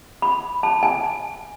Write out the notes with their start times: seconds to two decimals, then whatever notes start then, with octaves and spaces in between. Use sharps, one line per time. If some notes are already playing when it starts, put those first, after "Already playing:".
0.22 B5
0.63 A5
0.83 G#5